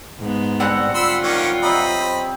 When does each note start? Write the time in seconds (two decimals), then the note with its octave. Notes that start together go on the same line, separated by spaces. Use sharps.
0.20 G#2 B3
0.60 D3 G3 C4 F#5
0.94 F4 B5 C6 E6
1.23 D#3 A#3 C#4
1.62 C3 F#3 D#5 B5
2.01 C5